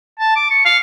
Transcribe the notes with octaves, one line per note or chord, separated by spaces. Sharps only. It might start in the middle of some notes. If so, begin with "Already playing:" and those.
A5
D6
C#6
F5